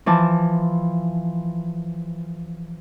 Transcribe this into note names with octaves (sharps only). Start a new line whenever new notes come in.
E3 F3 A5 D6